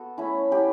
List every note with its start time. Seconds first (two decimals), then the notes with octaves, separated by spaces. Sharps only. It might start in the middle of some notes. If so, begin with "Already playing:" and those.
Already playing: B3 F#4 A4
0.18 A3 C#4 E4
0.51 F#3 C#4 E4 G4